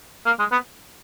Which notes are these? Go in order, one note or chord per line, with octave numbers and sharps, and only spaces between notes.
A#3
G#3
B3